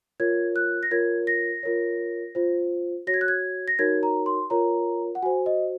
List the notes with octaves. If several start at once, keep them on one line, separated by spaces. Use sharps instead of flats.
F4 A#4 C#5 G#6
F#6
A#6
F4 A#4 C#5 G#6
A#6
F4 A#4 C#5
F4 C5
F#4 C#5 A#6
G#6
F#6
G#6
A#6
D#4 F#4 A#4 C#5 G#6
A#5
C6
F4 A#4 C#5 A#5
F#5
F#4 C5 G#5
D#5